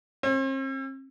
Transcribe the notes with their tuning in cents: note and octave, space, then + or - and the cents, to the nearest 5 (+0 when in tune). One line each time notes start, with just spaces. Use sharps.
C4 +45